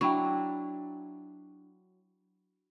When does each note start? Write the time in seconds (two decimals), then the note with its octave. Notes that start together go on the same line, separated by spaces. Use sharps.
0.01 F#3 D4 E4 G5 B5 C#6